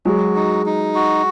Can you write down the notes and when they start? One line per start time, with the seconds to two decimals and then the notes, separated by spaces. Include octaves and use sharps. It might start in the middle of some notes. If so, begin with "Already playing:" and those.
0.05 F#3 G#3 F#4
0.36 D#4
0.66 D#4
0.95 F#4